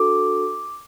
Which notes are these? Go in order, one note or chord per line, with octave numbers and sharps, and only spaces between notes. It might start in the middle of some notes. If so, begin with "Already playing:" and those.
Already playing: D4 F#4 A4 D6